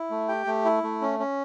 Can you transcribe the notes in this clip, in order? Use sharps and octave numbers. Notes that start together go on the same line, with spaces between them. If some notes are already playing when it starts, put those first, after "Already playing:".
Already playing: E4
A3
G4 G5
A3
E4
A3
C#4
C#4